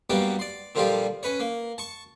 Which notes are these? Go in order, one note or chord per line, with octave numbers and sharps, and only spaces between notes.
G2 B2 G3 A#3 F#5 G5
D5 C6
A#2 D3 F3 G3 F4 G4
C#4 B4 C#5
A#3
A5 C#6